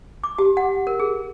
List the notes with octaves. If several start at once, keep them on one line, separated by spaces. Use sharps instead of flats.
D6
G4
F#5
A#4
G#4